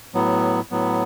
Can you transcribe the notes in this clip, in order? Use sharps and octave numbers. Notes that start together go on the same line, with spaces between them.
A2 F#3 B3
A2 F#3 B3